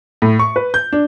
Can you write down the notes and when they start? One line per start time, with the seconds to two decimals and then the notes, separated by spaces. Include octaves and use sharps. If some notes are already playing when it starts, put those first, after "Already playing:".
0.22 A2
0.39 C#6
0.56 B4
0.74 G6
0.93 D4